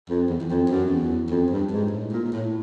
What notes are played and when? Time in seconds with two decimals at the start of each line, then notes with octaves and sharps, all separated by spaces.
0.09 F2
0.29 E2
0.40 E2
0.49 F2
0.70 F#2
0.91 E2
1.30 F2
1.51 G2
1.71 G#2
1.91 A2
2.12 A#2
2.25 A#2
2.32 A2